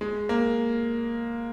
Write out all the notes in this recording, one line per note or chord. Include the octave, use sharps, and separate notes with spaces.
G#3
A#3